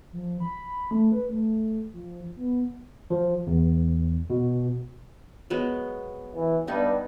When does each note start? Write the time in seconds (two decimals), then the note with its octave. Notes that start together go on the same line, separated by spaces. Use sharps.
0.12 F3
0.40 B5
0.91 A3
1.12 B4
1.29 A3
1.93 F3
2.36 B3
3.10 F3
3.47 E2
4.30 B2
5.50 F#3 G#3 B3
6.35 E3
6.67 G2 G3 B3 D#4